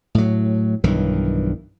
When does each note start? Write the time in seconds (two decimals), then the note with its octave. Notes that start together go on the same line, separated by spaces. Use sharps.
0.15 A2 F#3
0.84 B1 G2 D#3 E3